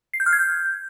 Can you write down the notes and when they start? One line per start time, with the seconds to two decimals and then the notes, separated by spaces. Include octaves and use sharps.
0.14 C7
0.20 G6
0.26 F6
0.33 G#6
0.39 G6